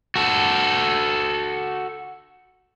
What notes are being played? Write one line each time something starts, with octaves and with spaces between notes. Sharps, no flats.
F#4 A4